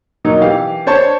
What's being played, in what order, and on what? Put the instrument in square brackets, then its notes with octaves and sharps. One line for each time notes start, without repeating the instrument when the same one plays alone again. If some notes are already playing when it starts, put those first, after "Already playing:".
[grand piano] B2 F#3 A#3 D#4
E3 G4 F5
D4 C5 C#5 A5